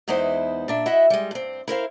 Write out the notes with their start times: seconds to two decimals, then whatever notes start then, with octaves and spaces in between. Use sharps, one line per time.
0.08 E2 G#3 B3 D#4 E4 C5
0.68 A#2 D4 E5
0.86 E4 F#4 D#5 E5
1.10 G3 G#3
1.31 G2 C4
1.67 E4 A#4 C5 F5